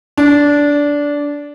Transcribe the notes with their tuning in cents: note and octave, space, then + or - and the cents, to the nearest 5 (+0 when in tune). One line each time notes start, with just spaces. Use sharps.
D4 -15